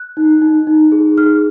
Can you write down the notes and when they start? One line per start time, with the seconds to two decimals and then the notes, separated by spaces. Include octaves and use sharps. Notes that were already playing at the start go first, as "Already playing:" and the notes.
Already playing: F#6
0.17 D#4
0.42 D#4
0.67 D#4
0.92 G#4
1.18 G#4 F6